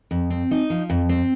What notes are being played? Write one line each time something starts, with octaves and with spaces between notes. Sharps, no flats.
F2
C4
D#4
F3
F2
C4